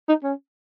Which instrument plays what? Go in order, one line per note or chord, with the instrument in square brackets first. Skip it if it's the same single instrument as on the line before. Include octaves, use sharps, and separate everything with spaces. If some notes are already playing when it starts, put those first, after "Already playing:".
[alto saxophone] D#4
C#4